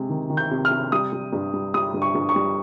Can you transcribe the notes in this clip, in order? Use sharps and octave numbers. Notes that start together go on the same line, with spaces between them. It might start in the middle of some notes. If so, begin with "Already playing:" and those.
Already playing: C3 G#3
D#3
D#3
G6
C3
F6
C3
G3 D#6
G3
G2
G3
G3 D#6
G2
C#6
G2
C#6
G3